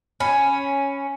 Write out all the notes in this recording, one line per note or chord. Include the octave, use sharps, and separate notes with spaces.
C#4 B5